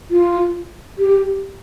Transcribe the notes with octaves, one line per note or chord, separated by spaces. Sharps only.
F4
G4